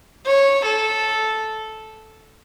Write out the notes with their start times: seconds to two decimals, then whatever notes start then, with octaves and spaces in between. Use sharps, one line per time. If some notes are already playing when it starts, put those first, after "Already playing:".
0.26 C#5
0.65 A4